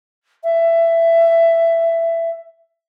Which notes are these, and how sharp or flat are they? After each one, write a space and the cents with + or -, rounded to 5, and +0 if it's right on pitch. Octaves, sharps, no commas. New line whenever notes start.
E5 +15